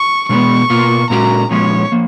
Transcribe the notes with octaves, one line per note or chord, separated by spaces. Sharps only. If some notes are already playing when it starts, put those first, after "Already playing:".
Already playing: C#6
B2 G#3 B3 C#6
B2 A#3 F4
A#2 G#3 C#4 F#4 A#4 A#5
A#2 F3 G#3 C#4 C#5
F3 A#3